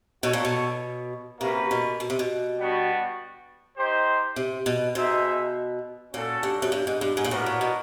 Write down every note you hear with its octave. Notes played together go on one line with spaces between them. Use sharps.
B2 F#4 A4 C#5
A#2
B2
C3 A#3 C#4 F#4 B4
B2
B2
C3
B2
G3 B3 D4 F#4
D#4 G4 C5
C3
B2
B2 D#4 G#4 C5 E5
A#2 C#4 F#4 A4
G2
F#2
G2
G#2
G2
G#2
A#2
A2 B3 D4 F#4 A#4
A#2
B2